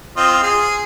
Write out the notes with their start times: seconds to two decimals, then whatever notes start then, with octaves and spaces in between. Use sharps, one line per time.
0.17 C4 F4 D#5
0.43 G#4